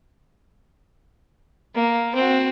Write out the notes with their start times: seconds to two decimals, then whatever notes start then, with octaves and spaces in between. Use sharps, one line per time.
1.75 A#3
2.15 C4 F#4